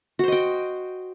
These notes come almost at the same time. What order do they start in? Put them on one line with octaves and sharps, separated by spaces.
F#4 C5 D#5 G5